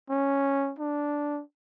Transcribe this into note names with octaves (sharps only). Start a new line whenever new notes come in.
C#4
D4